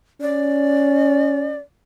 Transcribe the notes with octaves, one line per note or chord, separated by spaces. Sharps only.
C#4 D5